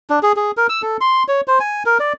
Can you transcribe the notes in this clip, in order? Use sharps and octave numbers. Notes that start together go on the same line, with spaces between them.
D4
G#4
G#4
A#4
E6
A4
C6
C#5
C5
G#5
A#4
D5